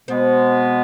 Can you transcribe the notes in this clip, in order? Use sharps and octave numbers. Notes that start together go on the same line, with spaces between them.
B2 G#3 B3 C4